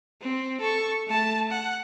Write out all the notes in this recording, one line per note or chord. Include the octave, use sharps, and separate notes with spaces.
C4
A4 C#6
A3 A5
F#5